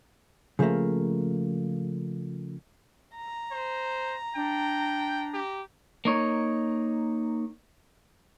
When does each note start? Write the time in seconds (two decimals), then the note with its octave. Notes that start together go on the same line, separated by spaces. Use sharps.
0.59 C#3 F3 G3 A3 A#3
3.16 A#5
3.52 C5
4.35 D4 G5
5.34 G4
6.05 A#3 D#4 C#5